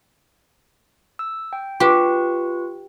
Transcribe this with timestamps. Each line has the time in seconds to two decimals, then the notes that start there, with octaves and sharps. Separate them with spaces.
1.19 E6
1.53 G5
1.80 F4 G4 B4 C#6